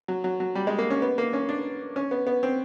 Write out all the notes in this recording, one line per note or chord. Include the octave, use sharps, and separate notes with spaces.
F#3
F#3
F#3
G3
G#3
A#3
C#4
B3
A#3
C#4
D4
C#4
B3
B3
C4